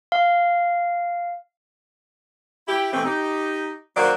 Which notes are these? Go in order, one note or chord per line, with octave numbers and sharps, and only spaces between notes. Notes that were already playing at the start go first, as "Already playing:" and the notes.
F5
E4 G4
B2 E3 A3 C4
D#4 G4
D#3 F#3 A#3 F#4 C5 D5